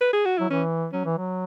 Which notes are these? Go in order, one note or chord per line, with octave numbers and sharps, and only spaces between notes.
B4
G#4
F#4
F#3 E4
E3 C#4
F#3 C#4
E3
F#3